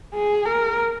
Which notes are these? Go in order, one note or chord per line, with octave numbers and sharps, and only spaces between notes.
G#4
A#4